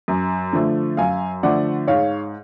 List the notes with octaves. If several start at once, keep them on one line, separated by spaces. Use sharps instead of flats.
F#2
D3 F3 A3
F#2 F5 G#5
D3 F3 A3 D5 F#5
G#2 C#5 F5